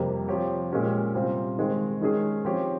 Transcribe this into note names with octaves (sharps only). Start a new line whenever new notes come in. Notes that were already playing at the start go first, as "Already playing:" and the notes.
Already playing: F2 C3 G3 A#3
F3 C4 G4 C#5
A#2 G#3 C#4 G4 C#5
C3 G3 C4 F4
D#3 G#3 C4
D#3 G#3 C#4 G#4
F3 C4 G4 C#5